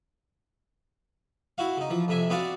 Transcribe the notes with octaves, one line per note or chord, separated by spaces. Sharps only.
E4 F#4 F5
C#3 D#4
E3 F3
F2 C3 E5 G#5
B3 C4 D4 F#4 D5 F5